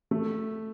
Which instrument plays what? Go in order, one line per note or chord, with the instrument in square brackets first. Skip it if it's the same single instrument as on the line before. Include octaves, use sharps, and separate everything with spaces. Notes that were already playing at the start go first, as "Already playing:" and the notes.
[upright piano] A3